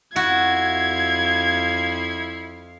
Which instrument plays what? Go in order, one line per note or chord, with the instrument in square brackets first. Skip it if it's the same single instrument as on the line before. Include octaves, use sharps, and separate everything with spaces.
[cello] F2 F5 [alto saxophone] E4 [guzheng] F#4 [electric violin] G#6